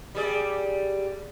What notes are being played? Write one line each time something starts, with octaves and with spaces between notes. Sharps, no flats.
G3 G#4 D5